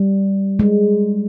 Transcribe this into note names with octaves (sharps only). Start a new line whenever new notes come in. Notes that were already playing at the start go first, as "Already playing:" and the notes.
Already playing: G3
G#3